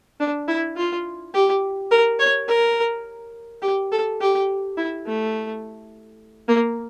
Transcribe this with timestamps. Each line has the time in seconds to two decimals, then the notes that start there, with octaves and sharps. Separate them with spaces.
0.20 D4
0.48 E4
0.77 F4
1.34 G4
1.91 A#4
2.20 C#5
2.48 A#4
3.62 G4
3.92 A4
4.21 G4
4.77 E4
5.06 A3
6.48 A#3